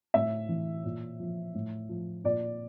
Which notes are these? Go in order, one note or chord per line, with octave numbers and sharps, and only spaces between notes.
A2 E5
E3
A#2
F3
A2
F3
A#2 D5